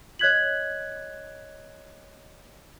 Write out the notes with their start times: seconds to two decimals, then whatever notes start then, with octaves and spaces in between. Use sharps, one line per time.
0.19 C#5 D#5 F#6 G#6 B6 F#7